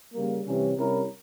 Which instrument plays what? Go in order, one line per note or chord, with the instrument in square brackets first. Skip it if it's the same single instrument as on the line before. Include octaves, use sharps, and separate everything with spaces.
[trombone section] C#3 G3 A#3
C3 E3 G3 C#4
C3 G3 C#4 E4 A#4